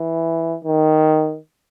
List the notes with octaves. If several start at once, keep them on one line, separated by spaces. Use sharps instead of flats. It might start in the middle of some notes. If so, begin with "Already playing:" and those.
Already playing: E3
D#3